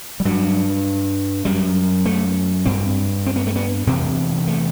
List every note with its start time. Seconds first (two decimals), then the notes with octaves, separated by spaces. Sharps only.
0.20 G3
0.25 G2 F#3
1.45 F#2 G3
2.06 A3
2.66 G2 C4
3.26 C4
3.36 B3
3.47 A3
3.56 B3
3.87 E2 C3 C4
4.47 A3